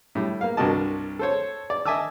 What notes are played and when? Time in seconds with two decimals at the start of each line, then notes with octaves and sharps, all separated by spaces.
0.15 A2 G3
0.41 A#3 F5
0.57 C2 G2 F#4 A#4 D#5 A5
1.19 A4 C5 C#5
1.70 D5
1.86 D#5 E5 G#5 A5 D6 E6